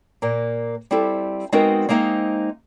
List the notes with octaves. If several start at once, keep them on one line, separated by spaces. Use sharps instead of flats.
A#2 A#3
G3 C4 E4 G4 A4
G#3 B3 C4 D#4 F#4 A#4
G#3 A#3 C4 D#4 E5